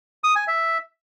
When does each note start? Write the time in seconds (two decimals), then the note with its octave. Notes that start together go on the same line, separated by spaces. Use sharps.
0.24 D#6
0.36 G#5
0.48 E5